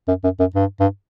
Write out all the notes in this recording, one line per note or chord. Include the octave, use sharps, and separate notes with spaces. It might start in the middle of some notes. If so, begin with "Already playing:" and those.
F#2
F#2
F#2
G2
G2